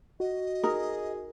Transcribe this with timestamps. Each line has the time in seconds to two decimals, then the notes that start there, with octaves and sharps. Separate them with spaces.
0.20 F#4 D#5
0.63 D#4 G#4 A#4